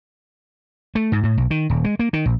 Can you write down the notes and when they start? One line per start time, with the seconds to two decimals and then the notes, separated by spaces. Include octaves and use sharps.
0.95 A3
1.12 G#2
1.24 A2
1.37 B1
1.51 D#3
1.70 D#1
1.84 G#3
1.99 A#3
2.13 D#3
2.26 A#1